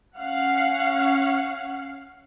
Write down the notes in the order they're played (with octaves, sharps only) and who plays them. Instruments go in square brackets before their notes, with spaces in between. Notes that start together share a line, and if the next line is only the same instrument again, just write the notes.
[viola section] C#4 F5 F#5